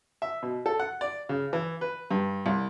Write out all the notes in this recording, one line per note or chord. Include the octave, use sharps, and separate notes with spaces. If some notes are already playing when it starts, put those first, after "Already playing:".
E5
B2
A4
F#5
D5
C#3
E3
B4
G2
C2